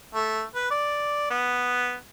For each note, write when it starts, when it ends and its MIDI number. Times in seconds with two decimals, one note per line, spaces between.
0.15 0.42 57
0.55 0.71 71
0.71 1.27 74
1.30 1.94 59